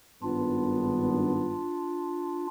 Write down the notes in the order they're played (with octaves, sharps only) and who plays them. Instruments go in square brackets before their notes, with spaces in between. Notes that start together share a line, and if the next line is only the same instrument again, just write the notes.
[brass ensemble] G#1 G2 B3 [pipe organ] D4 F4